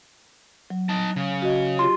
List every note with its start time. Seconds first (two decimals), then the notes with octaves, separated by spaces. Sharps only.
0.70 F#3
0.89 D#4 A5
1.16 C#3
1.42 F#4 D#5
1.79 F4 G4 C6